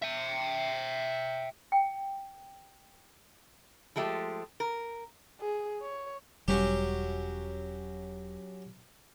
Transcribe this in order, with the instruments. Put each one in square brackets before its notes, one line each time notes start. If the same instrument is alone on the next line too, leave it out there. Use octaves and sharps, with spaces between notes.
[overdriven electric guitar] E5 G5
[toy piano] G5
[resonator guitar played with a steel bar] F3 G#3 A3 G4
A#4
[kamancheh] G#4
C#5
[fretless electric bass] E1 G3 [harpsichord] F#3 C#4 G4